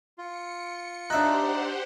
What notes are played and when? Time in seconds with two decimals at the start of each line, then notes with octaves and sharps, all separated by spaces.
0.18 F4 C#7
1.10 D4 D#4 G4 C5 E5 F#5 F#6